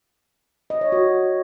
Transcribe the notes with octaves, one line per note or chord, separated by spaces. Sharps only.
D#5
C#5
F#4